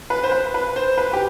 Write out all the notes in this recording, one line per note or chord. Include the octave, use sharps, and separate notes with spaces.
B4
C5
B4
B4
C5
B4
G4